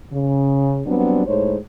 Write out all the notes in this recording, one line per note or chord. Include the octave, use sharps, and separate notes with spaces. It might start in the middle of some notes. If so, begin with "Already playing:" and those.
C#3
F#3 G3 B3 C4 D4
A2 G#3 D#4 C5 C#5